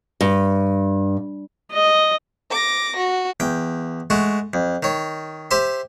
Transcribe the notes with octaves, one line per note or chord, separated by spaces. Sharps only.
G2
D#5
D6 A#6
F#4
E2 G5
G#3 A3 F#4
F2
D#3 C#5
G4 C5 E5 C6